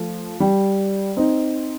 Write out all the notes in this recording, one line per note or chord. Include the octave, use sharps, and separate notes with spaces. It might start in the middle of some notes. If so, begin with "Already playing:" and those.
Already playing: F3 A3
G3
C4 D#4